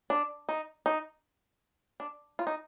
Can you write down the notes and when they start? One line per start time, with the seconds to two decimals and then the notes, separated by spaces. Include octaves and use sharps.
0.10 D4
0.49 D#4
0.86 D#4
2.00 D4
2.39 F4
2.47 D#4